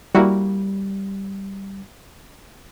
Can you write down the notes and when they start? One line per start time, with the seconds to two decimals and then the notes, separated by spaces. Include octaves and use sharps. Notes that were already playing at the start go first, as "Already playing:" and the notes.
0.15 G3 A#3 E4 F#4